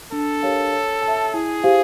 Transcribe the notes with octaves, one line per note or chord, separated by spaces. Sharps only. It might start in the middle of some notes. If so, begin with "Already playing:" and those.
D4 A4
G4 A#4 C#5 F5
C#5
A5
E5
E4 G#4
G4 C5 F5